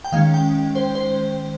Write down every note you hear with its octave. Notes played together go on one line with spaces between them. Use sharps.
G5
D#3 G#3 C#4 F5
G5
C5
C5